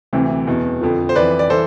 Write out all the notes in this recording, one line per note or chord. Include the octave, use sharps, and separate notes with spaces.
D2 C3 E3
E2 B2
F2 D3 F3
C5
F2 E3 B4 D5
D5
E3 A4 C5